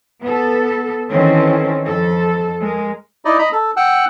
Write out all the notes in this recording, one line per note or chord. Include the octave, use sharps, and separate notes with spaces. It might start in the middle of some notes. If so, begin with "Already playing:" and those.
B3 A4
D#3 E3 C4 C#4 A4
F2 A4
G#3 A#4
D#4 E4 D5 D#5
D#5 A#5 B5
A4
F#5 G5 E6 F#6